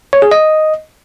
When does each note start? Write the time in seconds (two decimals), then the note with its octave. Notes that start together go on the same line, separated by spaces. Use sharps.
0.13 C#5
0.22 G#4
0.32 D#5